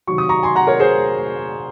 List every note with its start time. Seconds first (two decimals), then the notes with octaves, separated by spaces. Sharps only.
0.07 C3 D#3 F#3 C#6
0.18 D#6
0.29 A#5 C#6
0.43 G#5 C6
0.55 F#5 A#5
0.67 A#4 C#5
0.79 G#4 C5